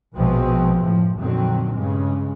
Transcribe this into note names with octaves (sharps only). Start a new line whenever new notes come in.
A#1 B2 F3 G#3 B3 C4
F#1 A2 F3
F2 A#2 D3 D#3 F#3 C4
G2 C#3 G#3